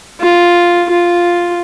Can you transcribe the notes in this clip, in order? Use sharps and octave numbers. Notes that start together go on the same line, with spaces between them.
F4
F4